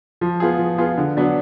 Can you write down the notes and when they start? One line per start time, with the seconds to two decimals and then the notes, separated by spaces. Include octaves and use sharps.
0.21 F3
0.40 B3 F4 G#4
0.59 F3
0.78 B3 F4 G#4
0.98 D3
1.17 F#3 B3 D4